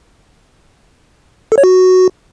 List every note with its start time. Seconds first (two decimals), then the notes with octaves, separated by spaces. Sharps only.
1.52 A4
1.58 C#5
1.64 F#4